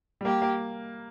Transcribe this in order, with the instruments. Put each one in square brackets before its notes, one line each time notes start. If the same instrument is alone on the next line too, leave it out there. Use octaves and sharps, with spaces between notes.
[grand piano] G3
[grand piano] A#3 [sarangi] G4
[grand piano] A#3